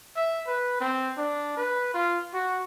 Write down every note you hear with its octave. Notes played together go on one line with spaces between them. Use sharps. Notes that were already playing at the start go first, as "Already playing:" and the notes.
E5
B4
C4
D4
B4
F4
F#4